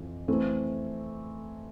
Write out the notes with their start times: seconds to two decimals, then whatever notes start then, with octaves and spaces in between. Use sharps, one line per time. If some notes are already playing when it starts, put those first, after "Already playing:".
Already playing: F2 E3
0.28 E3 A3 C4